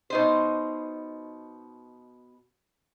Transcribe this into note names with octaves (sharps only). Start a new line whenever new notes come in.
B2 D#4 C5